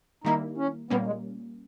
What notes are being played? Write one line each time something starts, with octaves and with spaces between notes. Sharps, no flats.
D#3 G3 A#3 D#4 E4
C#4
A#2 G3 A#3 B3 C#4
G#3